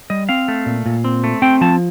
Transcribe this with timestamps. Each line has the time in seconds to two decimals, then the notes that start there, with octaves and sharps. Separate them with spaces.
0.10 G3 D#5
0.29 C4 F5
0.48 A3
0.66 A#2
0.86 A#2
1.04 C4
1.24 A3
1.42 C4 G5
1.61 F3 A5